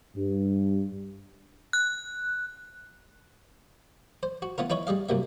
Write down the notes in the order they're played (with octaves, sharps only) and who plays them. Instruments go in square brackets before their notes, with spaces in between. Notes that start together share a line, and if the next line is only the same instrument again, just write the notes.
[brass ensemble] G2
[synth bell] F#6
[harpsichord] C5
F#4
E3 B3 F4 A#4
D#4 E4 B4 C#5 E5
G3 G#3 D#5 F5
C2 F#2 A#3 E5